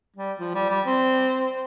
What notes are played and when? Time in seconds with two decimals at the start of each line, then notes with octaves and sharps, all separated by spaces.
0.16 G3
0.40 F3
0.55 G3
0.70 G3
0.86 C4